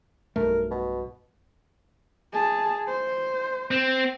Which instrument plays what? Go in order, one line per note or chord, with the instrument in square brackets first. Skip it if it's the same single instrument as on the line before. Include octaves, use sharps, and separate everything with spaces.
[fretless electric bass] B1 G2 A3 [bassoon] A#4
[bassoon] B2
[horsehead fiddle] G#4 A5
C5
[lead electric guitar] C4